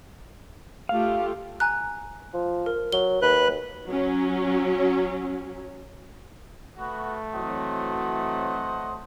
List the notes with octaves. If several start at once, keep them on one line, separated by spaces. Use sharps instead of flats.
A3 F4 G4 F5
G#5 A#5 F#6
F3
A#4
F#3 G7
D#2 B4 F#6
F#3 C#4
A3 B3 F#4
E3 F#3 C4 C5 D#5 F#5